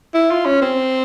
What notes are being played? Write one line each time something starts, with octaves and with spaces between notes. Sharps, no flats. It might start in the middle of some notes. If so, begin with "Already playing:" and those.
E4
F4
C#4
C4